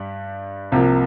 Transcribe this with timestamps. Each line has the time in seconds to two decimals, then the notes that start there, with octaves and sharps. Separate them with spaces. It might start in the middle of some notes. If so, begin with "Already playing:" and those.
Already playing: G2 G3
0.72 C2 C3 F3 A#3